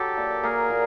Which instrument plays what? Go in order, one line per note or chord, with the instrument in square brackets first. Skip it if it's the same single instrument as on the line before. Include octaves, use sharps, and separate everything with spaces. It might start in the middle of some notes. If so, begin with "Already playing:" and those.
Already playing: [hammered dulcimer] F#3 [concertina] G4 A4
[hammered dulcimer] A#2
[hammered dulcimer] A#3 [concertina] G#4 A#4
[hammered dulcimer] A#2